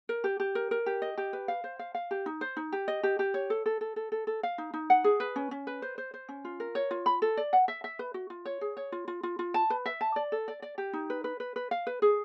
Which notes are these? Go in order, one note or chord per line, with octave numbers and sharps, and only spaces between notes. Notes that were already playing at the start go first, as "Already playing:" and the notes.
A#4
G4
G4
A#4
A#4
G4
D#5
G4
B4
F5
C5
F5
F5
G4
D#4
C5
D#4
G4
D#5
G4
G4
C#5
A4
A4
A4
A4
A4
A4
F5
D#4
D#4
F#5
G#4
B4
C#4
C#4
B4
C5
C5
C5
C#4
F4
A#4
C#5
F4
B5
A4
D5
F#5
E5
E5
B4
F#4
F4
C#5
G#4
C#5
F4
F4
F4
F4
A5
B4
E5
A5
D5
A4
D5
D5
G4
D#4
B4
B4
B4
B4
F5
B4
G#4